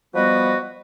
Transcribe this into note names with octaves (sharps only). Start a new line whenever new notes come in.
F3 G3 B3 F#4 B4 D#5